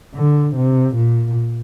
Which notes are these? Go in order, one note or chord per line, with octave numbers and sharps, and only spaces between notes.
D3
C3
A#2